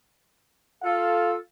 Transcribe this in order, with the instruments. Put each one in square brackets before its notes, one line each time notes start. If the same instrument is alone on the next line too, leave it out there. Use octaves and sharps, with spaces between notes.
[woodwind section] F4 A4 [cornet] F5